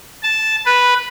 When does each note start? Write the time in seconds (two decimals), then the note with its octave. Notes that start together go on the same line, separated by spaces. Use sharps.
0.23 A5
0.66 B4